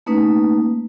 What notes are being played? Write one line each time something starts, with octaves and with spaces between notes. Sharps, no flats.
A3 A#3 C#4 D#4 B4